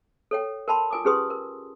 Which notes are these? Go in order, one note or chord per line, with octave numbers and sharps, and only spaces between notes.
A4 C#5 G5
A#4 G5 A5 B5 C6
F4 A#4 G#5 D6 D#6
C#4 G4 G#4 B4 C6 D#6
A#4